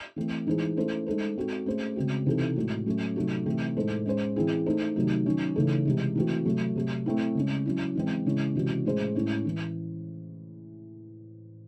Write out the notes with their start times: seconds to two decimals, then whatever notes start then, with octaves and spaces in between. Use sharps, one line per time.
0.16 E3 A3 C4
0.47 E3 G#3 D#4 G#4 C5
0.77 A3 C#4 E4 A4 C5
1.06 G#3 D#4 A4 C5
1.36 G#3 C4 F#4 A4
1.66 A3 C#4 G#4 C5
1.96 C#3 G#3 C4 F#4
2.26 C3 E3 C4 D#4 A4
2.56 A2 G#3 C4 F#4
2.86 F#3 A3 C#4
3.16 C3 F#3 A3 D#4 F#4
3.46 C3 E3 A3 C4
3.77 A2 G#3 D#4 A4 C5
4.06 G#3 C#4 G#4 C5
4.36 E3 C4 E4 G#4
4.66 A3 D#4 A4 C5
4.96 C3 D#3 F#3 A3 D#4
5.26 D#3 F#3 C#4
5.56 C#3 E3 A3 D#4 A4
5.85 C3 E3 G#3
6.15 E3 A3 C4 F#4
6.45 C3 F#3 A3
6.76 C3 F#3 A3
7.06 A3 C4 E4
7.35 C#3 G#3 C#4
7.66 F#3 C#4 E4
7.96 E3 G#3 C4
8.26 C#3 G#3 C#4 E4
8.55 C3 E3 G#3 C#4 F#4
8.85 A2 G#3 C#4 G#4 C5
9.15 A2 G#3 C#4 E4
9.45 E3